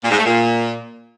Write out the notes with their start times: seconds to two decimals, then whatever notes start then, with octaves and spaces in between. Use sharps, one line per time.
0.04 A#2
0.11 G#2
0.19 A3
0.26 A#2